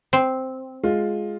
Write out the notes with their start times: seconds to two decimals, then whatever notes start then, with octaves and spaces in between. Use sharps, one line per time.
0.13 C4
0.83 G#3 F4